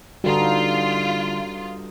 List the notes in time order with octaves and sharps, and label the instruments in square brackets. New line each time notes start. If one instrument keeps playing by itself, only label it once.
[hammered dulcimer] G2 D#4 [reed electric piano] D3 G3 [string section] F4 [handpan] F#4 A4